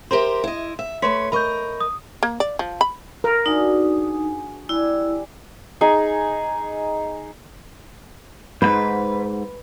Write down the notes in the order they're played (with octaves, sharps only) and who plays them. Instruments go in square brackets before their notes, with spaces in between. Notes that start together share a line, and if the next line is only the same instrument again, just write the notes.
[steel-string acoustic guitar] G4 A#4 C5 [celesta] E5 C6
[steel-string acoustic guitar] E4 D#5
E5
[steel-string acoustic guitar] A3 B4 C#5 [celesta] C6 B6
[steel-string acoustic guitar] A#4 D#5 [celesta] B5 C#6 G6
[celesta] D#6
[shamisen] A#3
D5
F3
B5
[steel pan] A#4
[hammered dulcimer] D4 F#4 G#4 [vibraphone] D#4
[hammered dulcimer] G3 G#5 [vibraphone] E4
[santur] D#4 G#4 G#5
[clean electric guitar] C#2 G#2 [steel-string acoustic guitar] B4